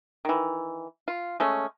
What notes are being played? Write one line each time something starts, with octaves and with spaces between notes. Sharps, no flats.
D#3 E3
F4
G#3 A3 C#4